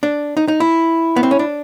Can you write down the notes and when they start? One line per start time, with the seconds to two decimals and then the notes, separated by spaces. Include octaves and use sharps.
0.03 D4
0.37 D#4
0.48 D#4
0.60 E4
1.16 B3
1.23 C4
1.31 C#4
1.39 D4